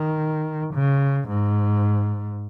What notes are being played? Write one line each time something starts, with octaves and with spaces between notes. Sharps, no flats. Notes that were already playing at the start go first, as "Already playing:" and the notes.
Already playing: D#3
C#3
G#2